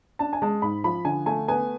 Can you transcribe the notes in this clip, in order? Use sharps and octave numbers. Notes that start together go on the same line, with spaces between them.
D4 A5
G#5
G#3 A5
G#2 B5
F3 B5
D3 G#5
A3 G#5
B3 G#5